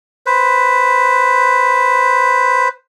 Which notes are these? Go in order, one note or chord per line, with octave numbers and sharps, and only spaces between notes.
B4 C5